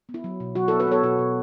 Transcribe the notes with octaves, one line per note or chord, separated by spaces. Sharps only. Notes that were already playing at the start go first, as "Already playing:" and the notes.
B3
E4
F#3
B2
F#3 F#4
E4 A4
B3
F#4 B4
B3 A4 C#5
B2 F#4
B2